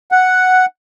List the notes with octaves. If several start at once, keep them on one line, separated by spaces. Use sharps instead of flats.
F#5